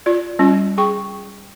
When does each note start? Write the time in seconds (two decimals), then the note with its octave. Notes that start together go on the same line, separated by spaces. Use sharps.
0.06 F4 D5
0.39 G3 C#4 F4
0.78 G#4 G5 C#6